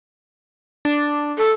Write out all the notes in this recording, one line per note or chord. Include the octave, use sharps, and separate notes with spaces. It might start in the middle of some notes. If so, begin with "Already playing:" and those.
D4
A4